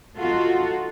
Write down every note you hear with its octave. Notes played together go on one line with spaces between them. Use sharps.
D#4 F4 F#4 A4